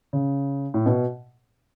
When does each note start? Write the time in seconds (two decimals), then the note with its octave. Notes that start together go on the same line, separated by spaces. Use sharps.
0.13 C#3
0.74 A2
0.86 B2